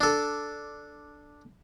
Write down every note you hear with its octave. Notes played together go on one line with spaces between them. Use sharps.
D4 A4